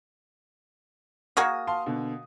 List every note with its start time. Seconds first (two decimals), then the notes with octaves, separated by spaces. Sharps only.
1.37 A#3 F#4 G#4 D#6
1.67 F5 A5 C6
1.86 B2 D3